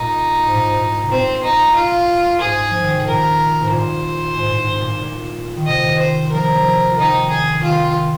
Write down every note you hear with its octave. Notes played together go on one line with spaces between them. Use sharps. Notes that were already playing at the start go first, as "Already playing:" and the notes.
Already playing: A#2 D#4
G#2
A#2
G#2
C3
A#2 C4
D#4
F4
G#2 G#4
F3
D#3
C3
A#2 A#4
G#2
A#2 C5
G#2
G#2
A#2
A#2
D#3
C3 D#5
C5
F3 A#4
F3
F3
D#3 D#4
G#4
D#3 F4